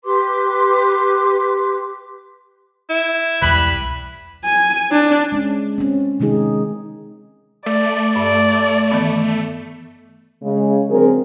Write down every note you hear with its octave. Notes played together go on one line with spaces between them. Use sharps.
G4 B4 C6 D6
E4
E1 C2 G3 B4 B5
G#5
D4
G#3 C#4
C4 C#4
C3 D#3 G#3 D#4 G#4
A3 D5
G2 D5
D#3 E3 B3
C#3 G#3
D3 F#3 C4 G#4 A#4